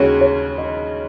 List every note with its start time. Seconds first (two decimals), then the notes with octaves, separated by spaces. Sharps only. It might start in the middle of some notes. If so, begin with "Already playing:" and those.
Already playing: D#2 C#3 G#3 C#4 F#4 C#5
0.21 C#5
0.58 D#5